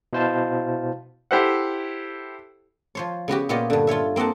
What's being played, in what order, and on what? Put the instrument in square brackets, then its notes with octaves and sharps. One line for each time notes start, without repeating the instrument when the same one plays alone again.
[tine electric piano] B2 E4 C5 F5 A5
[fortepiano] E4 G4 A4 C5 E5 F#5
[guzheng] F3 C5 C#5
C#3 B3 F#4 G4
A#2 B3 F4 G4 C#5 D#5
G2 D3
F4 A4 C#5 E5
A#3 C4 D#5 F#5 A5